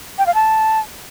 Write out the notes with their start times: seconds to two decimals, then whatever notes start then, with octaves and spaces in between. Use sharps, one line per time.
0.18 G5
0.27 F5
0.35 A5